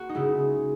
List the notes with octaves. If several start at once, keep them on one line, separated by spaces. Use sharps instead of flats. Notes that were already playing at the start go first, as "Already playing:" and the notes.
Already playing: A#3 F#4
D#4
C#3 G#3 E4